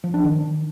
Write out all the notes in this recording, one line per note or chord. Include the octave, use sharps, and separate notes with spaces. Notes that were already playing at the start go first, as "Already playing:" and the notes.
F3
D4
D#3